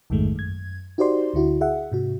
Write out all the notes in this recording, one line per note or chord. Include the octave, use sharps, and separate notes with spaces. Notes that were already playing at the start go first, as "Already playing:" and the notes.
A#1 F2 G#2 D#3 G#3 A3
F#2 G#6
D#4 F#4 G4 C5 D5 C6
D2 D3 E4 F#4
G#4 E5 F#5
G#2 C3 F#4